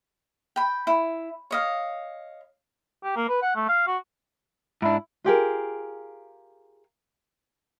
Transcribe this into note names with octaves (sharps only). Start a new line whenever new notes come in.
G5 B5
E4
C#5 D#5 F5
G4
A#3
B4
F#5
A3
F5
F#4
G#2 D4 E4
F4 G4 G#4 A#4